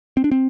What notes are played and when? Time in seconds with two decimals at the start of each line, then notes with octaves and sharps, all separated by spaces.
0.17 C4
0.24 D4
0.32 C4